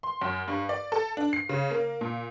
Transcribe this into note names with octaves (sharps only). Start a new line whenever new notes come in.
C6
F#2
G2
D5
A4
D4
C7
C#3
A#3
A#2